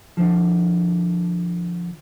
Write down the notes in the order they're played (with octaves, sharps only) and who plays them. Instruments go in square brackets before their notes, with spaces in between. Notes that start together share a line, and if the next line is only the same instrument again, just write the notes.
[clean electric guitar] D3 F3